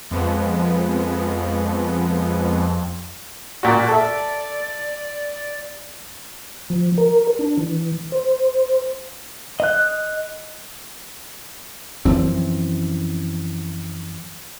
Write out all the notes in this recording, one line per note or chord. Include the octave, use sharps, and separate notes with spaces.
F2 F3 G#3 B3
A#2 F#4 D5
A4 E5
F3
A#4
D4
E3
C5
D#5 F#6
F#2 E3 F3 C4